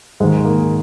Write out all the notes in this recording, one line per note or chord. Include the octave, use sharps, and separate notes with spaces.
G#2 D#3 G#3
A#3